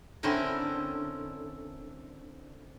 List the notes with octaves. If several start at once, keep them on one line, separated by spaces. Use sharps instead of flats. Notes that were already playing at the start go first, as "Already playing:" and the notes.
D3 C4 C#4 E4 A#4